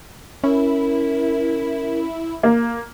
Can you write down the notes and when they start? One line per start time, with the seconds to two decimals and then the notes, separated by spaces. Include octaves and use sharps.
0.44 C#4 E4 A#4
2.43 A#3